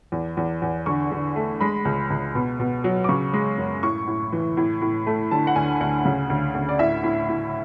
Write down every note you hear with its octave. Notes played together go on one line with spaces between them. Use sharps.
E2
E2
E2
D3 C#6
D3
A3
G#3 B5
C#2
C#2
B2
B2
F#3
D6
C#3 C#6
G#3
F#2
A2 C#6
A2
E3
A2
A2
A3
D3 A5
F#5
D2 G#5
D2 F#5
C#3
D2
D2
D5
A2 E5
A2
A2